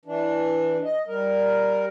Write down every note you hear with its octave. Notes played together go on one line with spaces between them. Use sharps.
E3 D4
D#5
G3 A#4